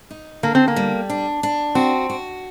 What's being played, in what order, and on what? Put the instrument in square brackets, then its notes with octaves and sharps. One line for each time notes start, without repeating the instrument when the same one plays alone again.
[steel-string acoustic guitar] D#4
[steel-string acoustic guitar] D3 [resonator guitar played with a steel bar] A#3
[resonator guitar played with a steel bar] C4
A#3
[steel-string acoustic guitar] G3
D4
D4
[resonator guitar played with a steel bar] C4 [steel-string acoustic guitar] F#4
[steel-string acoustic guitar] F#4